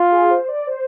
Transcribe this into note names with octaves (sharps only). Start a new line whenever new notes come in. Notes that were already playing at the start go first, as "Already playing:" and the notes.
Already playing: F4
G#4
C5
D5
C5